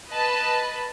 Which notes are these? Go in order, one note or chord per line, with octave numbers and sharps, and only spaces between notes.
B4 D#5 A5 B5